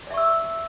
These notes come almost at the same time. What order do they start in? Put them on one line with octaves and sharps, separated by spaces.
D5 E5 C#6 E6